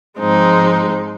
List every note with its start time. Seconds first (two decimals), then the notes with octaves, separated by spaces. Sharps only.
0.19 G#2 F3 G#3 C4 D#4